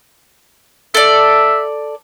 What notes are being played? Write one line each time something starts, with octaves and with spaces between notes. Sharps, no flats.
A4 D5 E5